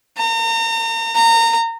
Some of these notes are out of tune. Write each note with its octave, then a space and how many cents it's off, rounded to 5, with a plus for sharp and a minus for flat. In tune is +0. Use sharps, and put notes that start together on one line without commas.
A#5 -40
A#5 -25